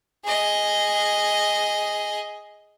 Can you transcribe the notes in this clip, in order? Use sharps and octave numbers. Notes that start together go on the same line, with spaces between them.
G#4 D#5